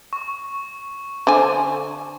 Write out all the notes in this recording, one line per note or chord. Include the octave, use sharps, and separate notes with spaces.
C#6
D3 C5 G#5